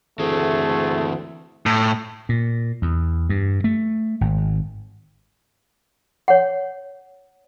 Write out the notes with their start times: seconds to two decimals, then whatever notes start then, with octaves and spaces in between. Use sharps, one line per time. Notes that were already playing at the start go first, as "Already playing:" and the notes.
0.19 D2 E3 A3 C4 G#4
1.66 A2
2.29 A#2
2.82 E2
3.29 G2
3.64 A3
4.21 G#1
6.28 C#5 F#5